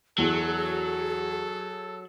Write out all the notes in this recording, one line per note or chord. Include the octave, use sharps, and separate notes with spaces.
E2 F#3 G#4 A4